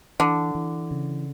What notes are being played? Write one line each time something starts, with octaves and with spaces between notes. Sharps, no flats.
D3 E3
E3
C#3